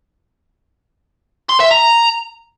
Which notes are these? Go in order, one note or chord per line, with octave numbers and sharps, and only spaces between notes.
C6
E5
A#5